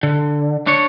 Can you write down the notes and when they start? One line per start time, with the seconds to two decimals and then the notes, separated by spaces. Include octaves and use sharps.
0.03 D3
0.67 D4 C#5